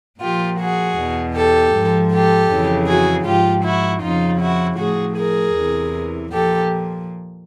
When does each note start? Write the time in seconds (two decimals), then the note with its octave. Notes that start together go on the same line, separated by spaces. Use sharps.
0.21 A#2 F3 F4 G4
0.59 F#4 G#4
0.97 E2 B2
1.36 G4 A4
1.73 G#2
1.78 F3
2.12 G4 A4
2.50 F2 C#3 E3
2.87 F#4 G#4
3.26 G#2 F3 F4 G4
3.64 E4 F#4
4.02 F2 C#3 F3 D#4 F4
4.40 E4 F#4
4.78 A2 F3 F#4 G#4
5.17 G#4 A#4
5.54 E2 C3 E3
6.32 A#2 F3 G4 A4